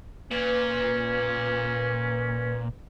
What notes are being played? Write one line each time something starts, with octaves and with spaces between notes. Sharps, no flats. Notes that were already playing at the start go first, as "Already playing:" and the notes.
A#2 C#4 B4